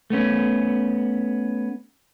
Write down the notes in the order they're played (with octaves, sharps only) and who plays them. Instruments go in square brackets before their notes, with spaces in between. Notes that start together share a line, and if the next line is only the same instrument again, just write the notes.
[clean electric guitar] A3 B3 C#4